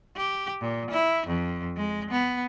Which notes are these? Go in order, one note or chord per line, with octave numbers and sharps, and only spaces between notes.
G4
A#2
E4
F2
G#3
B3